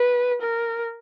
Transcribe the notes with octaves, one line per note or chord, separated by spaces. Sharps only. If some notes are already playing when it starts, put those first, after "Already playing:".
Already playing: B4
A#4